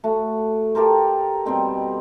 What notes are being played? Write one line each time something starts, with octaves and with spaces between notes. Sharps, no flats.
A3 F#4
G4 A4 A#4 C5
B2 G3 C4 D#4